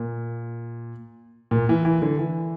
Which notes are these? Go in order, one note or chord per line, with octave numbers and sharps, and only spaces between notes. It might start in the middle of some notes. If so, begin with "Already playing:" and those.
Already playing: A#2
A#2
E3
E3
D3
E3